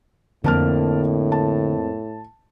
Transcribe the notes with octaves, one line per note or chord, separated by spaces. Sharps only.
F2 A2 D3 A#3 A#4 A5 F6
A5